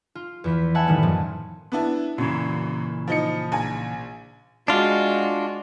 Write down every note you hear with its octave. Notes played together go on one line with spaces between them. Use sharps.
F4
E2 E3 B6
E5 F#5 G#5 A5 B5
A2 D#3 E3 G3 B3
F#2 A#2 D#3 F3
B3 D4 E4
F#2 A#2 C#3 E3
F3 D#4 C#7
A#1 G#5
G#3 D4 F4 F#4